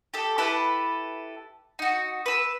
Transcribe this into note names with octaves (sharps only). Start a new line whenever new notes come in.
G4 A4
E4 G4 A4 B4
D#4 F#4
B4 E6